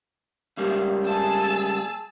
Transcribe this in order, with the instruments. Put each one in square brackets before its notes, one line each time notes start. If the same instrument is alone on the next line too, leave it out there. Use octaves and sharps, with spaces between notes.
[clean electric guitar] C#2 G3 A#3
[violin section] G#4 A5 E6